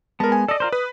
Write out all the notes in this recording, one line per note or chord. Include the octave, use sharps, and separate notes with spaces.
G#3 B3 A#4 A5
G#5
A4 D5 D#5
F4 A#4 C5
B4 D#6